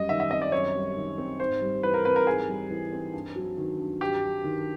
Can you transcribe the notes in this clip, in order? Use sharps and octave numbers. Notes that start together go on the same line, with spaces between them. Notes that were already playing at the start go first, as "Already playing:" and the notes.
Already playing: F#2 G3 D#5
D#3 E5
E5
C4 D#5
D5
F#2 C#5
G3
D#3
C4
G#2 C5
G3
E3 B4
A#4
C4 B4
A#4
G#2 G#4
G3
E3
C4
G2
F#3
D#3
G2
G2 G4
F#3
D#3